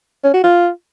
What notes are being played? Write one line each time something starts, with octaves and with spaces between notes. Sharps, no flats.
C#4
F#4
F4